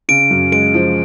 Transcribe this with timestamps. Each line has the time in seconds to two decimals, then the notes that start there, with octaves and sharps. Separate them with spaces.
0.09 C#3 D7
0.31 F#2
0.52 G#3 D7
0.74 F3